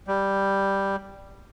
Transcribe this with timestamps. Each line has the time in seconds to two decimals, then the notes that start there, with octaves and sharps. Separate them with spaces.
0.07 G3